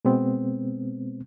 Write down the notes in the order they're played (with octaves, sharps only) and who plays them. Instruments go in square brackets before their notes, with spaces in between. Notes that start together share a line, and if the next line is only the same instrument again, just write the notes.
[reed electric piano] B2 G#3 B3 C4